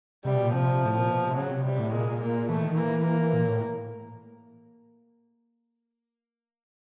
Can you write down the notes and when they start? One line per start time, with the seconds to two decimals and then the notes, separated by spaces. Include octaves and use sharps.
0.25 C3 G3
0.34 B2
0.44 A#2
0.53 C3 F3
0.85 A2
0.98 A#2
1.11 B2
1.24 C3
1.37 C#3 F#3
1.51 C3
1.65 C3 G3
1.79 A2
1.93 A#2 G#3
2.21 A#3
2.49 E3 A3
2.63 D#3
2.77 E3 A#3
3.05 A#3
3.34 A#2
3.47 A2